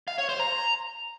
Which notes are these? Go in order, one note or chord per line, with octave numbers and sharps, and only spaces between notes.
F5
C#5
C5
A#5